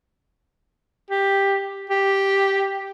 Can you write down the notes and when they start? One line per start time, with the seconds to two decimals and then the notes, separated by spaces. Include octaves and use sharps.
1.10 G4
1.90 G4